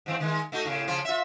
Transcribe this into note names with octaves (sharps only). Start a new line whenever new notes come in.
G#2 E3 C4
D#3 G#3
A3 D#4 F#4
A2 C#3
C#3 F3 F4
F4 E5